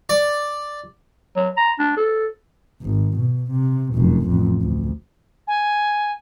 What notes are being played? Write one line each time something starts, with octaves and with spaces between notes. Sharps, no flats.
D5
F#3
A#5
D4
A4
G#1
B2
C3
F1 F#2
A1 F2
D2
G#5